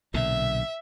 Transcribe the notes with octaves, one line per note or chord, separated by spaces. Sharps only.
B1 A#2 D3 E5